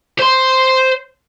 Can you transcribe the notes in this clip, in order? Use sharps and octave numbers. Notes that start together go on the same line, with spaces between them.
C5 C6